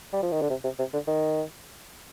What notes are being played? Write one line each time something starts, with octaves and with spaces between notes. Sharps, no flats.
G3
F3
D#3
D3
C3
C3
C3
D3
D#3